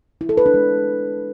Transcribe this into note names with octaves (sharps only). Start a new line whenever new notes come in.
E4
A4
B4
D4
G#3